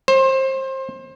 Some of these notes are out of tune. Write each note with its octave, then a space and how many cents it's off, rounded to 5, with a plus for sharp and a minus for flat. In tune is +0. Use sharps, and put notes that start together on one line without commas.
C5 +25